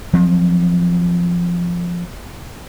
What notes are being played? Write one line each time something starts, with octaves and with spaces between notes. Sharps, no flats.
F3 F#3 C4